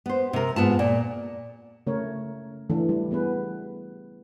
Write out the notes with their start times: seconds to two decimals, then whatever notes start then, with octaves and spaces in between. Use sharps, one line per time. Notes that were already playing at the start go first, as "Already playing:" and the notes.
0.06 B3 C5
0.33 C3 A#4
0.56 G#2 B3 F4 A5
0.79 A#2
1.87 C#3 A3 C#4 A#4 C#5
2.70 C#3 E3 A3 D4 A4
2.89 G3
3.11 G3 B3 G#4 B4